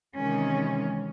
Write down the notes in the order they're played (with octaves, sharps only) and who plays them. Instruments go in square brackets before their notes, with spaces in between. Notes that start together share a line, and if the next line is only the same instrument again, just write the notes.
[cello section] C3 D#3 E3 G#3 C#4